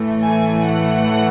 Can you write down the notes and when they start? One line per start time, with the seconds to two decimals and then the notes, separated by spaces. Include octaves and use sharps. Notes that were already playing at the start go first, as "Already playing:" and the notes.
Already playing: A2 E3 A3
0.24 G#5
0.68 F#5